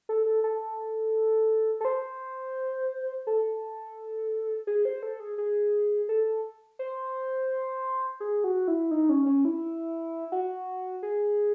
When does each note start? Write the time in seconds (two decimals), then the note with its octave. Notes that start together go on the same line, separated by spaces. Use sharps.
0.09 A4
0.26 A4
0.44 A4
1.81 A4
1.85 C5
3.27 A4
4.67 G#4
4.85 C5
5.03 A4
5.20 G#4
5.38 G#4
6.09 A4
6.79 C5
8.20 G#4
8.44 F#4
8.68 E4
8.91 D#4
9.09 C#4
9.26 C#4
9.45 E4
10.32 F#4
11.03 G#4